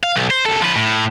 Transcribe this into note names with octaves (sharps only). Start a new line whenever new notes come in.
F5
B1
C5
C2 A4
F3 B4
A2